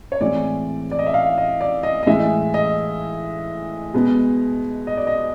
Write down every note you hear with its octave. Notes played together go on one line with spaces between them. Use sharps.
C#5
A2 E3 G#3 C4 D5
D5
D#5
E5
F5
D#5
D5
D#5
D#5
A2 E3 G#3 E5
D#5
B2 G#3 B3
D#5
D5
D#5